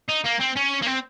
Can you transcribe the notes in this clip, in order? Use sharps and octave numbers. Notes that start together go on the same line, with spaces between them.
D#4
A#3
C4
C#4
A#3
C4